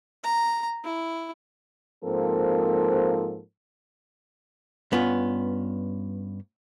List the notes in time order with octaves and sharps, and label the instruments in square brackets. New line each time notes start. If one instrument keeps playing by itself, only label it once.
[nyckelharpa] A#5
E4
[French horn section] G#2 F3 A#3 C4 A4 A#4
[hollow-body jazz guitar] G2 B3 C#4 F4